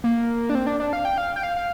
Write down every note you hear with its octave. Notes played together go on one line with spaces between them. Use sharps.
A#3
D4
C4
D4
D4
F5
G5
F5
G5
F5
F5